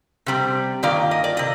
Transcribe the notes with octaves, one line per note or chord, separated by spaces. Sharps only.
C3 G3 C4
G2 D#3 A#3 F4 D5
D#5
D5
C3 D#5